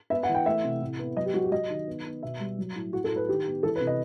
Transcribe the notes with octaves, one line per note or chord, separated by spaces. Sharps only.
B3 E5
F#5
E3
G5
A3 E5
C3
A2
B3
F#3 D#5
G4
F#3 F#4
G4
F#3 D#5
D#3
B3
B3
B2 E5
G3
F#3
A2
A2 F#4
A4
A2
B4
D#3 G4
B3
E3 A4
B4
C3
D#5